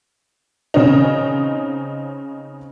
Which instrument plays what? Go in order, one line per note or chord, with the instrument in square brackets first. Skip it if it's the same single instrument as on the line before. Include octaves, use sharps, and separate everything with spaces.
[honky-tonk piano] C#3 C4 C#4 D#4